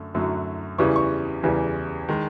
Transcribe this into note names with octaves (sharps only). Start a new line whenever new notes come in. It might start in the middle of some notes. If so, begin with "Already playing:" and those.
Already playing: F#2 D3 A3
F#2 D3 F#3 A3
E2 C#3 E3 G3 C#6
C#6
E2 C#3 E3 G3
D#3 G#3